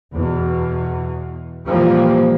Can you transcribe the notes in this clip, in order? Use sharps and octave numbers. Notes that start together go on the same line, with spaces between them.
E2 B2
A#2 E3 F3 G3 A#3